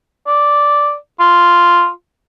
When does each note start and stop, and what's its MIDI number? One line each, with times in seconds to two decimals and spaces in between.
0.27 0.95 74
1.20 1.89 65